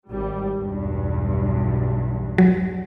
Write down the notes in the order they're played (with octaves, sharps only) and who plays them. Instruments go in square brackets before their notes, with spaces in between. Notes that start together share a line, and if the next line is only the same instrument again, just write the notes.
[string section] G#1 G3
B1 E2 G2
[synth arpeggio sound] F#3